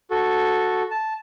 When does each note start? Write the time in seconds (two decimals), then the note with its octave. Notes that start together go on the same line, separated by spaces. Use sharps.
0.11 F#4 A4
0.91 A5